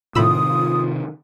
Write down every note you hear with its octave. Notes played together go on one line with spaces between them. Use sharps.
A2 C3 D#3 F4 B5 D#6 E6